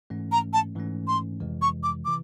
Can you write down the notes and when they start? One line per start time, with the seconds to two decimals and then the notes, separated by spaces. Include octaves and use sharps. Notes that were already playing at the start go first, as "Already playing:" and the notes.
0.10 G#2 E3 A3 C#4
0.32 A#5
0.53 A5
0.76 G#2 E3 A3 C#4
1.07 C6
1.40 F2 C3 E3 G#3
1.62 C#6
1.83 D6
2.05 C3 E3 D6